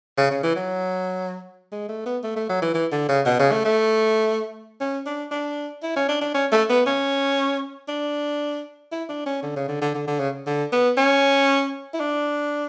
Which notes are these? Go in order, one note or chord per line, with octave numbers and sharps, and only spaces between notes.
C#3
C#3
E3
F#3
G#3
A3
B3
A3
A3
F#3
E3
E3
D3
C#3
B2
C#3
A3
A3
C#4
D4
D4
E4
C#4
D4
D4
C#4
A3
B3
C#4
D4
E4
D4
C#4
D3
C#3
D3
D3
D3
D3
C#3
D3
B3
C#4
E4
D4